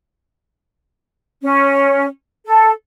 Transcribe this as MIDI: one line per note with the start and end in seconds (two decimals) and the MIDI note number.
1.42 2.06 61
2.46 2.71 69